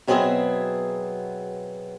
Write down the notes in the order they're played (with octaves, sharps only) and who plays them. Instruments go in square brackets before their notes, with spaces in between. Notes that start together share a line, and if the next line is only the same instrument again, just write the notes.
[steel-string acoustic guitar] B2 F#3 B3 C4 G#4 E5